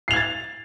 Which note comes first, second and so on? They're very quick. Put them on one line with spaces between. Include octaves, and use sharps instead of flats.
C7 F7 G#6 A6